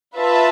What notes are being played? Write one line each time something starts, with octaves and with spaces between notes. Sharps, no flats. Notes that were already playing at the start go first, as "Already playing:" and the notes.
F4 B4 E5 A5